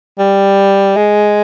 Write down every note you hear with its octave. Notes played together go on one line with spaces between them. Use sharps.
G3
G#3